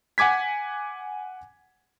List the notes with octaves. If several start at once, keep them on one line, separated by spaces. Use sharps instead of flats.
F#5 G#5 D6 G#6 B6